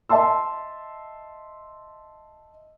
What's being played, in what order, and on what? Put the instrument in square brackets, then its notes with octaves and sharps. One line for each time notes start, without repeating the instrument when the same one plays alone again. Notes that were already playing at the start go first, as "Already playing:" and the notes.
[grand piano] D#5 E5 A5 C6 E6